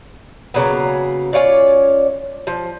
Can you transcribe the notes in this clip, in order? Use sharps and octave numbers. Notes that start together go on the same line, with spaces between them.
C#3 F#3 A#3 B3
C#4 F4 C#5 D5
F3